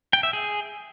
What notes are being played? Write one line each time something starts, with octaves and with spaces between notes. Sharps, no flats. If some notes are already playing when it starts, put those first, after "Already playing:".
G5
E5
G#4